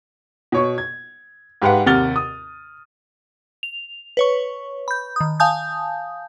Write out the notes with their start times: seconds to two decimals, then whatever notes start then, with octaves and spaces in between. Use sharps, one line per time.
0.52 B2 C#5 C#6
0.78 G#6
1.62 G#2 G4 B4 F5 F#5
1.86 D#2 C3 F#5 F6 A6 G7
2.16 D#6
3.63 F7
4.17 B4 C#5 C#6
4.88 B5 G6
5.16 D#3 D#6
5.40 F5 G#5 A5 D#6 G6